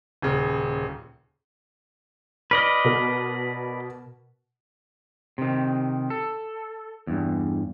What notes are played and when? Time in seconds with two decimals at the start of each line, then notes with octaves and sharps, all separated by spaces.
0.22 D#1 C#3
2.51 B4 D5 D#5 F6
2.84 B2 A#4
5.38 C3 D#3
6.10 A4
7.07 E2 G2